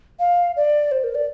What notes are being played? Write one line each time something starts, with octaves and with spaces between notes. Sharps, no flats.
F5
D5
C5
A#4
D5